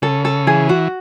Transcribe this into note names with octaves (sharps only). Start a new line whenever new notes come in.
C#3 A4
A4
E3 G#4
F#4